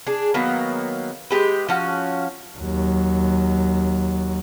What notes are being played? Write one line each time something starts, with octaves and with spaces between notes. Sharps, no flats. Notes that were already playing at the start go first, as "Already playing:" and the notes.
D4 G#4
D#3 F#3 A#3 B3
G#3 G4 B4
F3 C#4 F#4
D#2 F#3